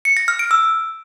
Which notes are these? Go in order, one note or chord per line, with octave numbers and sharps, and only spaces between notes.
C#7
A#6
F6
D7
E6